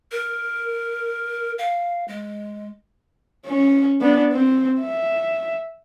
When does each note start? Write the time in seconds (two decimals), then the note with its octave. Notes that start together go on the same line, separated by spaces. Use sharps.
0.11 A#4
1.58 F5
2.08 G#3
3.47 C#4
4.01 B3 D4
4.32 C4
4.81 E5